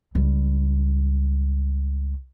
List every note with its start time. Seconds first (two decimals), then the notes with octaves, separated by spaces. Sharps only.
0.15 C#2 G3